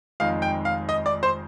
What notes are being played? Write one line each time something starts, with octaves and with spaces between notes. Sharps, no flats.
F1 F2 D#3 G#3 D#4 F5
G5
F5
D#5
D5
C5